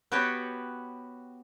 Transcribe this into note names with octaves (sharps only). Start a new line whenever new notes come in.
B3 F#4 G4 B4 C#5 G5